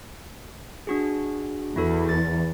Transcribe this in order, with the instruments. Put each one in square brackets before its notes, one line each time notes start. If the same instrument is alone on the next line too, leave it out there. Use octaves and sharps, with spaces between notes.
[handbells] D4 F#4 G#4
[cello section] E2 [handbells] E4 F#4 A4
[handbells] A6